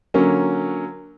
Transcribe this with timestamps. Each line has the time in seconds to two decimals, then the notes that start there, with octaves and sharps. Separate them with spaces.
0.14 D3 F#3 A#3 C#4